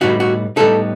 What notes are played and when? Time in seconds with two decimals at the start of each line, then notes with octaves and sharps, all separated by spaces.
0.01 A2 G3 B3 D#4 F#4
0.20 F#4
0.56 A2 G3 B3 D#4 A4